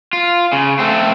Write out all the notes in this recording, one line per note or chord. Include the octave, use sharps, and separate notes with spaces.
F4
C#3
A3 C4